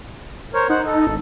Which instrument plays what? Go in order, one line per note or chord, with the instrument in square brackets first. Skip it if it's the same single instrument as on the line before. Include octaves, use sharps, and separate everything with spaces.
[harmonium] A#4 C5 C#5
[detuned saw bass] D#4 [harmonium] C5 F#5
[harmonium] A4
[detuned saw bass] G#1